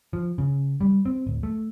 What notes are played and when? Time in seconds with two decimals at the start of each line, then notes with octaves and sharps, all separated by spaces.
0.13 F3
0.38 C#3
0.81 G3
1.06 C4
1.27 D1
1.43 A3